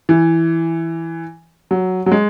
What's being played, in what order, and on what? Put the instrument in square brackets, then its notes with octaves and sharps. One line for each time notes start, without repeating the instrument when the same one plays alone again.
[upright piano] E3
F#3
F#3
G#3